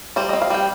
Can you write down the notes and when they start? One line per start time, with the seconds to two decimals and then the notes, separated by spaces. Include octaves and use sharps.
0.16 G3 C5
0.29 C4 D#5
0.42 F5
0.50 G3 G5